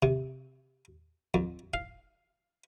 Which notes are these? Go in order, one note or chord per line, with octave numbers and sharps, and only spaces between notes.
C3
F2
F5